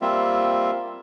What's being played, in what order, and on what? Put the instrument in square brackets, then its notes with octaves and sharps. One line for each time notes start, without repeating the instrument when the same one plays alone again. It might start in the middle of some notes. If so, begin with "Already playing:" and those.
[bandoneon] G3 A#3 C4 F4 E5